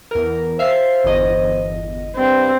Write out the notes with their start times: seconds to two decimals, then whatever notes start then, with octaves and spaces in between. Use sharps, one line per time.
0.11 E2 A#4
0.59 C5 E5 F5 C7
1.04 G1 E2 D#5
2.16 G2 C4